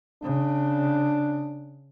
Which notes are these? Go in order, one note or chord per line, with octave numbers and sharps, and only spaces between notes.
C#3 D4